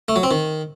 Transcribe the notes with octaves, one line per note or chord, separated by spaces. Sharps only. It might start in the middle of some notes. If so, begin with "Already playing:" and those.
A3
F#3
C4
D#3